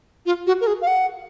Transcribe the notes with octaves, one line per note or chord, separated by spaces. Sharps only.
F4
F#4
A#4
G#4
F5
F#5